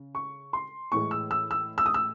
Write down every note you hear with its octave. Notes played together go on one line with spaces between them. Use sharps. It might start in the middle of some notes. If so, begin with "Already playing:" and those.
Already playing: C#3
C#6
C6
A2 E3 G#3 C#6
E6
E6
E6
E6
D#6
E6